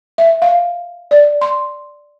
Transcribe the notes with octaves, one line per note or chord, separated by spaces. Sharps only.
E5
F5
D5
C6